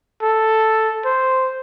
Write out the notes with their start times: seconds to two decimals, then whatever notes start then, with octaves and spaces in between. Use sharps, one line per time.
0.22 A4
1.05 C5